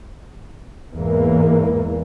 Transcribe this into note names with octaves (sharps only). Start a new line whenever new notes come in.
E2 G#2 E3 A#3